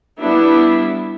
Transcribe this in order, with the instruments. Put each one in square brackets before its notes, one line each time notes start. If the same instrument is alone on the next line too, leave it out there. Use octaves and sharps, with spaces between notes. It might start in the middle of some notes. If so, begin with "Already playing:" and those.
[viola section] G3 B3 D4 E4